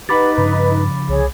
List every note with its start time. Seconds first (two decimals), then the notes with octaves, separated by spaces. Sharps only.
0.09 D#4 G4 B4 F#5 B5 D6 A6
0.37 G2 C#3 F3
1.09 C2 G#4 C#5